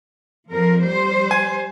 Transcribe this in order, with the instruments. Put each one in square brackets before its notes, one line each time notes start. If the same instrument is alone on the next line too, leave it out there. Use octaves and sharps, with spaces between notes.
[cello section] F2 F3 A#4
G3 C5
[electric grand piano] G#5